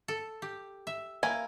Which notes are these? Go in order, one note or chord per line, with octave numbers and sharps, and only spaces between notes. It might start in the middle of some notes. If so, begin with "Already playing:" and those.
A4
G4
E5
A#3 E4 G#5